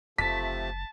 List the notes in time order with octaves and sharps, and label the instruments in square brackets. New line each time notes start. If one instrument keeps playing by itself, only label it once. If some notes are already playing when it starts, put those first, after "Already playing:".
[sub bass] F#1 [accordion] C3 F3 A3 [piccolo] A5 [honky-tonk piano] B6